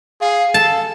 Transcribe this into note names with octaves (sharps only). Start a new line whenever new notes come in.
G#4 F5
A4 A5